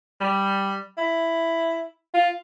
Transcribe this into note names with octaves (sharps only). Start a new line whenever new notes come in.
G3
E4
F4